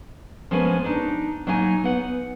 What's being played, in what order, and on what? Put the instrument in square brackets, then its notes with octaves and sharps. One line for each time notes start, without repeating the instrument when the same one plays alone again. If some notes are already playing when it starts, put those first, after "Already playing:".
[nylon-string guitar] F3 G#3 A#3 B3 C#4 G#5
D4 D#4
F#3 A#3 D#4 G#5
B3 F#5